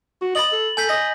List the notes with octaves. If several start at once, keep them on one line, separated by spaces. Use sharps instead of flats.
F#4
D#5 B5 A6 F#7
A4
A4 G#5 G6 B6
D#5 A#6